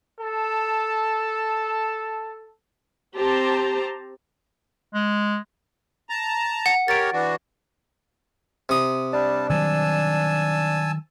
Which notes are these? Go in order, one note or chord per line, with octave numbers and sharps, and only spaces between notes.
A4 A5
C4 G4 C5 A5 A#5
G#3
A5 A#5
F#5
G4 A#4 C#5 A6 D7
E3 D4 F#4
C3 D#6
G3 D4 A5
D#3 F#3 G3 G#5 A5 E6